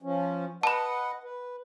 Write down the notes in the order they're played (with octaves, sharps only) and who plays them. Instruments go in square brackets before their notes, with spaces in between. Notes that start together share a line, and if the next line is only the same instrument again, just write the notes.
[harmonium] F3 C#4
[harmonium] B4 D#5 F#5 [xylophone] A5 B5
[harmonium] B4